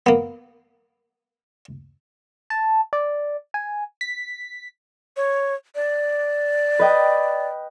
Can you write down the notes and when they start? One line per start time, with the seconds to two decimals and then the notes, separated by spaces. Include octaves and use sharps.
0.06 A#3 B3
2.50 A5
2.93 D5
3.54 G#5
4.01 B6
5.17 C#5
5.75 D5
6.79 B4 D#5 G5